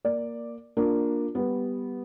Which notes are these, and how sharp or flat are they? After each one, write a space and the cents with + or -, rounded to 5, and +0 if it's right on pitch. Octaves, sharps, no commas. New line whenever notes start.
A#3 +0 D5 +0
A#3 +0 D4 +5 F4 +20
G3 +0 B3 +0